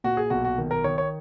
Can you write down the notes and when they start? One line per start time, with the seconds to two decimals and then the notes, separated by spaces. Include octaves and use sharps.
0.04 A#2 F#4
0.17 G#4
0.30 B1 F#4
0.45 F#4
0.58 D#3
0.71 A#4
0.84 D#3 C#5
0.98 C#5